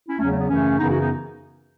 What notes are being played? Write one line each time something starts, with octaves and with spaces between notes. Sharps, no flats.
C#4 E4
E2 C#3 F#3 A3 C#4
A3
B3
F#2 C#3 E3 A3 C#4
F#2 C#3 E3 B3 D#4
D#4 F#4
B3 D#4